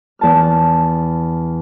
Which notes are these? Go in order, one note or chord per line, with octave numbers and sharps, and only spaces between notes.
E2 A5 F6